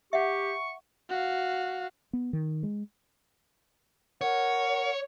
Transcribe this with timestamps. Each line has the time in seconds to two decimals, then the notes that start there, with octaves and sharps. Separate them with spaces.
0.13 G4 E5 F#5 C#6
1.09 F#4 F5
2.13 B3
2.33 D#3
2.63 G#3
4.21 A#4 C#5 F#5